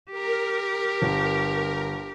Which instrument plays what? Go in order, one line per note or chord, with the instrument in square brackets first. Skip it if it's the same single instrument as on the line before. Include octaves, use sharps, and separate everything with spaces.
[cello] G4 [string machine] A#4
[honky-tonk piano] G1